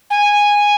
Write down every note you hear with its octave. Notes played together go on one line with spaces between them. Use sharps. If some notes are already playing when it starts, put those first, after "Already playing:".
G#5